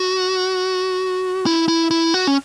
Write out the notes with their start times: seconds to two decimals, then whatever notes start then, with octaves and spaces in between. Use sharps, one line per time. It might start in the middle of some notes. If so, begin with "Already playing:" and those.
Already playing: F#4
1.46 E4
1.68 E4
1.91 E4
2.14 F#4
2.27 C#4